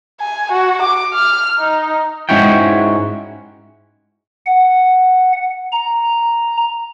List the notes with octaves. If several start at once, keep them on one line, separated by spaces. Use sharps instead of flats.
G#5
F#4
D6
F6
D#4
G#2 G#3 C#4 E4 F#4 G5
F#5
A#5